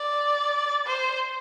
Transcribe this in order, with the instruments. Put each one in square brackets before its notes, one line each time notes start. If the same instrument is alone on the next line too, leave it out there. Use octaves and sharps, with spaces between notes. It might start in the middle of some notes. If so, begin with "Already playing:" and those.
Already playing: [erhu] D5
C5